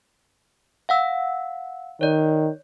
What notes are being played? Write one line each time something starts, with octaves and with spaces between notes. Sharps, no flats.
F5 F#5 E6
D#3 C#5 D5